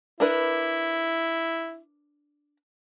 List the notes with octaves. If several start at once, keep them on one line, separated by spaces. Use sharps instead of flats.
D4 E4 A#4 B4